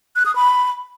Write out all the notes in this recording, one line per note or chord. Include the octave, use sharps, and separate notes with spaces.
F#6
D#6
B5